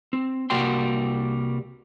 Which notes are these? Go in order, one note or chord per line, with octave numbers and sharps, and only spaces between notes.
C4
C2 G3 A#3 F#4 G5 C6